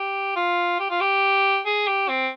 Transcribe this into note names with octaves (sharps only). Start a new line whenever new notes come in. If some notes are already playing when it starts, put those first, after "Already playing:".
Already playing: G4
F4
G4
F4
G4
G#4
G4
C4